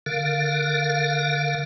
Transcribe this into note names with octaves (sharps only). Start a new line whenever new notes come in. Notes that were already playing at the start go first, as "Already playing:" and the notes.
D3 A#4 F5